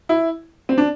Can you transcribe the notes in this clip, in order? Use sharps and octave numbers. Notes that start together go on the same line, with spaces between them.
E4
C4
D4